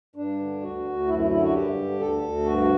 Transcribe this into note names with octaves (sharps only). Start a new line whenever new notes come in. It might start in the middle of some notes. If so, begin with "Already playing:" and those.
G2 D4
D3
D2 F#4
D2
F#2 E4
E4
D3 E4
F#4
G2 G4
D3
D2 A4
D2
G2 F#4